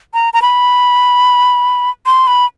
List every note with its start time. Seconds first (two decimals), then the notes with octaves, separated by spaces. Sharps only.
0.14 A#5
0.34 A#5
0.42 B5
2.06 C6
2.27 B5